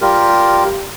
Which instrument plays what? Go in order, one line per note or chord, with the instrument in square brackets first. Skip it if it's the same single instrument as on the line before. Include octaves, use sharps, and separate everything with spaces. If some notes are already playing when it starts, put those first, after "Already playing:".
[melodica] G3 F4 G4 A#4